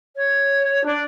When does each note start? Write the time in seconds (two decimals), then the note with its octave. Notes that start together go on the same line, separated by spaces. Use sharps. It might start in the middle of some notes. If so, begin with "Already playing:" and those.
0.16 C#5
0.85 D4